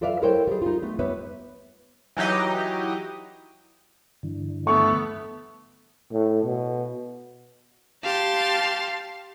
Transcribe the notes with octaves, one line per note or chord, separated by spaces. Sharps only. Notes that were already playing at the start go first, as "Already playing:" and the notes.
F4 A4 B4 D5 E5 F5
E4 A4 A#4 C5 C#5 G5
G3 G#4
D#4 F4
A3 B3
G3 B3 B4 C#5 E5
E3 F#3 D#4 G4 D#5
G2 D3 E3
A3 B3 C#6
A2
B2
G4 F5 A5 C6